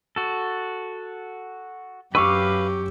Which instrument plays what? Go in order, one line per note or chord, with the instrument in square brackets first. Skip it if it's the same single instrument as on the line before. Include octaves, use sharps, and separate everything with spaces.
[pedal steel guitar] F#4 A4
[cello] F#2 [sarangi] G4 [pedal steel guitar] B4 F5 [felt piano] C#6 D6 E6